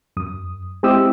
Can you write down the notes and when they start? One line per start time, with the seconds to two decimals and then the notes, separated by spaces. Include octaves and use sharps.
0.17 F#2 D#6
0.83 G#3 C4 E4 G4 D#6 E6